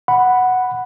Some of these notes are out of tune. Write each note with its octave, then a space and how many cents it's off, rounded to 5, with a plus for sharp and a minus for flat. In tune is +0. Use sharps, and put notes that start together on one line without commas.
F#5 +0 B5 +0